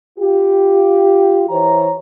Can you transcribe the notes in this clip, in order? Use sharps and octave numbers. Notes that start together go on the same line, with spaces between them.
F4 G4
E3 C5 C#5 A#5